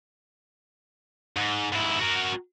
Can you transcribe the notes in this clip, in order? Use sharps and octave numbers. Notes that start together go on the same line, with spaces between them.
G#2
G#2 E4
F#4 A#4